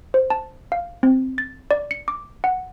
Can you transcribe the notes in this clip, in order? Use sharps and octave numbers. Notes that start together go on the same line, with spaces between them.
C5
A5
F5
C4
A6
D5
C#7
D6
F#5